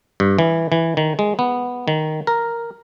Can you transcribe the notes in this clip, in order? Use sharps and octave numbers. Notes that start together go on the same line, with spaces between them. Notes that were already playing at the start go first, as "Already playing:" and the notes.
G2
E3
E3
D#3
G#3
B3
D#3
A#4